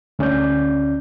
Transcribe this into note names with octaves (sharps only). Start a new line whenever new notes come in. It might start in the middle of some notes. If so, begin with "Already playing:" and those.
D2 C#4 D5 G6